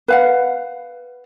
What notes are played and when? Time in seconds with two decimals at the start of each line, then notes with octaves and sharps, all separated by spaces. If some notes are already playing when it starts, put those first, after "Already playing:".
0.08 B4 F5 F#5